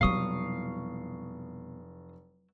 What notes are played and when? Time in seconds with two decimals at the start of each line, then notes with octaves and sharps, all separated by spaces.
0.01 F1 B2 F#3 G3 E4 F5 C#6 D#6